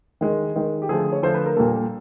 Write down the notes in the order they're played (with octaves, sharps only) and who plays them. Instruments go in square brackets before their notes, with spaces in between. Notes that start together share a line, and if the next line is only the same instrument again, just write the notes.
[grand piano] D#3 G#3
D#3 G#3
G4
D3 F3 A3 G#4
C#5
D3 F3 A3 C5
B4
A#4
A#2 G3 A#3 A4